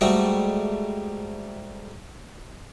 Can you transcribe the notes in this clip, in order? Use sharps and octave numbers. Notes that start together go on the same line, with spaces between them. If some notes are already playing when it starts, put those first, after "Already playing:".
G#2 G3 A3 F#4